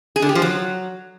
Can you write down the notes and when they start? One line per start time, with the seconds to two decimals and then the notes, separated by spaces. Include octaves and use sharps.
0.16 G#4
0.22 D3
0.29 G4
0.35 F3
0.42 F#3